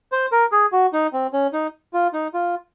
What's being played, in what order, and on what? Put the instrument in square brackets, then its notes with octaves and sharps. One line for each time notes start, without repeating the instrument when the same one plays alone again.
[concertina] C5
A#4
G#4
F#4
D#4
C4
C#4
D#4
F4
D#4
F4